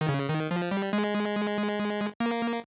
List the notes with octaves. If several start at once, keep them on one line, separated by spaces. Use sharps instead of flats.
D#3
C#3
D#3
F3
G3
G#3
A#3